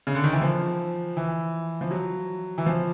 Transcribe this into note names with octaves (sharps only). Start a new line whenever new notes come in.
C#3
D3
D#3
E3
F3
E3
F3
F#3
E3
F3